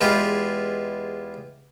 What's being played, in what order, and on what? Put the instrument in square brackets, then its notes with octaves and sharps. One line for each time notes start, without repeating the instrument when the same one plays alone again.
[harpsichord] E2 G#3 F4 G4 B4